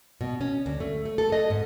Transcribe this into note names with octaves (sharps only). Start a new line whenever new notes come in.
B2
C#4
D2
A3
A3
A4
D#5
G#2